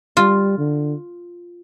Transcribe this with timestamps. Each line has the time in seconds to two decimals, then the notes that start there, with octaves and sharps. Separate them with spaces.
0.17 G3 F4
0.58 D3